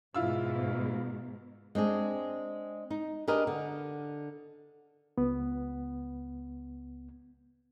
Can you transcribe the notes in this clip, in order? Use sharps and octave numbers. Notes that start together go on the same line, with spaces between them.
G#2 B2 E4 F4 E6
G#3 C4 D4 G#4
D#4
D4 G4 G#4 A#4 B4 D#5
D3
C#2 B3